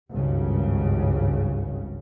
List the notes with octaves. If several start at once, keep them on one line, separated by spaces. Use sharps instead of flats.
G#1 C#2 G2 C#3